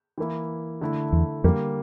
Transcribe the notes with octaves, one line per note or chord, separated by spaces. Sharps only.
E3 A#3 E4
D3 A3 E4
E2
F2 D3 G3 A#3